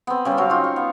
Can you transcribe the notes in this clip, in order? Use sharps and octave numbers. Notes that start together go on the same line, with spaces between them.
B3 C4
C#3 G3 C4
F#3 F5
D#4 F4
C#6
B3